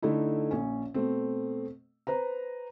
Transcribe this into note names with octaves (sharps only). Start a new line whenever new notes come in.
D3 A3 D#4 E4
A#1 C#4
B2 A3 C4
B4 C5 A#5